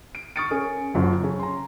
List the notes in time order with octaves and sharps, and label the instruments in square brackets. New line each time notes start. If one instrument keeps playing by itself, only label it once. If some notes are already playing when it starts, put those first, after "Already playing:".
[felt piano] D7
C#6 D#6 F6 A6 C#7 D7
C#4 G#4 A#4
F#1 F#2 F4 F#4
C#3 C#4
A#5 C6